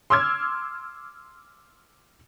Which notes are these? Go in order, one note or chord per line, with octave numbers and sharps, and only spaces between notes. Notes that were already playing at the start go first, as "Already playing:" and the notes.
C6 D6 E6 F6 G#6